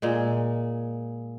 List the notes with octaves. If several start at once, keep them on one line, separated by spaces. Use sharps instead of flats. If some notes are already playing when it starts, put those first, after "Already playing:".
A#2 G#3